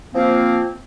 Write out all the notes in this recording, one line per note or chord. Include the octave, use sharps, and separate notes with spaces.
F3 A#3 C4